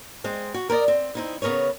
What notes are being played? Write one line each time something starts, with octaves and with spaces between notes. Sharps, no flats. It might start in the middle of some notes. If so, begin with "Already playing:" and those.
G#3 C4
F#4
A#4 B4 D5 D#5
C4
C4 D#4 E4
C#3 B3 A#4 B4 C#5